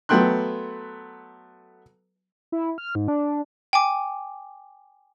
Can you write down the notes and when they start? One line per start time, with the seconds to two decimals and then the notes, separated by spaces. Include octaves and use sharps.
0.09 F#3 A3 B3 G5 C6 F#6
2.52 E4
2.78 F6
2.95 G#2
3.08 D4
3.73 G5 G#5 D6